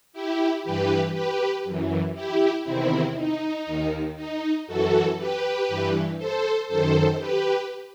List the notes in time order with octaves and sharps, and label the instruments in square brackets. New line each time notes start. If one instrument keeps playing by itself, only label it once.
[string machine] E4 G4
G2 E3 G4 B4
G4 B4
F#2 E3
E4 G4
E2 C3 D#3 C4 E4
D#4
D#2 D#3
D#4
F#2 E3 F#4 A4
G4 B4
G2 E3
A4 C5
F#2 D#3 A4 C5
G4 B4